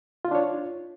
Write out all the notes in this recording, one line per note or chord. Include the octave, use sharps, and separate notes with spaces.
D4 D#4 F4 C#5